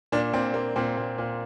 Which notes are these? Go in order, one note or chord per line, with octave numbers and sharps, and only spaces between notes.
A#2 D4
A#2 C4
A#2 A#3
A#2 C4
A#2
A#2